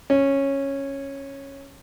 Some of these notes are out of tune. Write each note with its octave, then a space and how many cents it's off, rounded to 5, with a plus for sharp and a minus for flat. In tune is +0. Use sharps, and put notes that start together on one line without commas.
C#4 -10